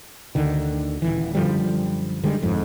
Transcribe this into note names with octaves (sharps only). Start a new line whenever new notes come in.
D2 D3 D#3
D#1 G#1 E3
F#2 D3 F3 G3
D3 D#3 G3 G#3
G1 F2 G#2